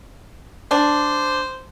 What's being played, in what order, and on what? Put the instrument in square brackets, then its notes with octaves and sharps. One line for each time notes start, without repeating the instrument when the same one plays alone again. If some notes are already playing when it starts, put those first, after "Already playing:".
[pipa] D4 [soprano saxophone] C5